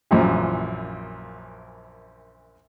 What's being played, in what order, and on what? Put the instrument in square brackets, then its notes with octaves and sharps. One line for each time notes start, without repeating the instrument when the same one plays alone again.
[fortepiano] A#1 F#2 A#2 E3